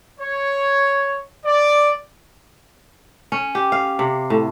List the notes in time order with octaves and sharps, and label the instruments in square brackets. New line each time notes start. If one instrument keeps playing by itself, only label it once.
[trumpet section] C#5
D5
[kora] C#4
G4
F5
C3
A2